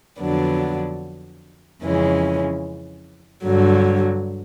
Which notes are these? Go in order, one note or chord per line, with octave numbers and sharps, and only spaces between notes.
F2 D3 F#3 B3 D4
F2 C#3 E3 G#3 C#4
G2 D3 F#3